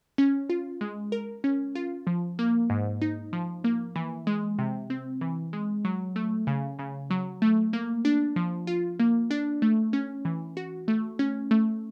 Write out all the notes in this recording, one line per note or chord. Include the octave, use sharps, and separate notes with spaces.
C#4
F4
G#3
A#4
C#4
F4
F3
A#3
G#2
D#4
F3
A#3
E3
G#3
C3
C4
E3
G#3
F#3
A3
C#3
C#3
F#3
A3
A#3
D4
F3
F4
A#3
D4
A3
C#4
E3
F#4
A3
C#4
A3